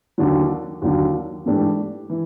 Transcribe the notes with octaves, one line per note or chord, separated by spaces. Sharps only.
D#2 D3 F#3
D#2 D3 F#3
G#2 E3 A3 D4 G4
E3